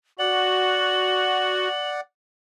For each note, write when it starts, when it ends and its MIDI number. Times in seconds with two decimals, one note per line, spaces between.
0.19 1.68 66
0.19 2.01 74
0.19 2.01 78
0.19 1.90 102